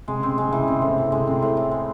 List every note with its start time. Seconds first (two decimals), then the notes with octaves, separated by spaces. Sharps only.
0.08 C3 G#3
0.19 C#3 C4
0.28 C3
0.38 C#3 G#3
0.49 C3 E3
0.59 C#3
0.68 C3 C4
0.79 A2 C#3
0.89 C3
0.98 C#3 E3
1.11 C3 G#3
1.20 C#3
1.27 C3 C4
1.42 A2
1.57 A2
1.71 G#3